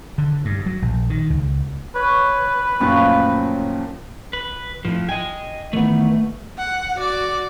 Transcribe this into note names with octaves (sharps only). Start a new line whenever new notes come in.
D3
G2
F#3
A#1
D#3
C#2
B4 C#5
F#2 A#2 D#3 F3 A3
B4
F2 A2 F3
D#5 G5 G#5
D#3 E3 A3 B3
F#5
F#4 D5